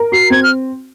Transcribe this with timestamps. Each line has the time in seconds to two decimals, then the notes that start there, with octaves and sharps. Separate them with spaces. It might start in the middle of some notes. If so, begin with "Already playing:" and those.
Already playing: A#4
0.12 F#4 C7
0.30 C4 G#6
0.43 F6